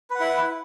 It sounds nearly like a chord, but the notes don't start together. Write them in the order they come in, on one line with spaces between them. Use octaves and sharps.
B4 F#5 E4